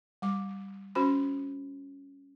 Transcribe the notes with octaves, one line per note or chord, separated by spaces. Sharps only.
G3 D6
C#4 F#4 C5 B5